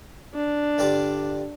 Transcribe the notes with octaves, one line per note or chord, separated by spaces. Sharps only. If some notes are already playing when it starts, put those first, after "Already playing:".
D4
G2 D3 G3 F4 D5